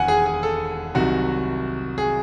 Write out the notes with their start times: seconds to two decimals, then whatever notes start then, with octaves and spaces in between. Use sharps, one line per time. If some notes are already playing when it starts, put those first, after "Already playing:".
Already playing: E1 D#2 F#5 G#5
0.08 G#4
0.26 G#4
0.43 A4
0.95 C2 C3 D#3 F#3 F#4
1.98 G#4